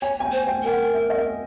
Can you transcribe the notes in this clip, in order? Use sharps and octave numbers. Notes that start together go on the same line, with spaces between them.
C#5 G#5
G#5
G5
C5
G5
A#4 G5
F#5
E5
D#5
E5